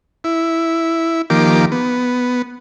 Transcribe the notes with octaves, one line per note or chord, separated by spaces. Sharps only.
E4
D#3 F3 A#3 G4 D6
B3